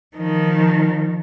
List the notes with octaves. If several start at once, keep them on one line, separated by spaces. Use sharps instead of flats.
D#3 F3